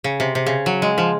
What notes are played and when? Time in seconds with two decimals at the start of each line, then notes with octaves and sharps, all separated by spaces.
0.04 C#3
0.20 C3
0.35 C3
0.46 C#3
0.66 F#3
0.82 G#3
0.98 F3